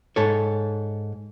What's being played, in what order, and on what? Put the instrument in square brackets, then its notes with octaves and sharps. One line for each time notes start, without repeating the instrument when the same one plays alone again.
[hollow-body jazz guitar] G#2 A4 C#5